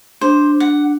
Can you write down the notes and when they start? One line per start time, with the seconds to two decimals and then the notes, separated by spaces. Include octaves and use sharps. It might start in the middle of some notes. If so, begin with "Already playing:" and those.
0.21 D4 C5
0.60 F#5